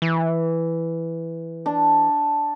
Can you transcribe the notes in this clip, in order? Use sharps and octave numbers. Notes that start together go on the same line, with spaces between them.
E3
D4